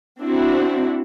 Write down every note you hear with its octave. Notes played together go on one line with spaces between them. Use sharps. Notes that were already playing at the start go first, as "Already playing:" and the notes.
C4 D4 E4 F#4